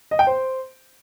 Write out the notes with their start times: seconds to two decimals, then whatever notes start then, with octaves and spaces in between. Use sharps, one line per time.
0.11 D#5
0.19 G5
0.27 C5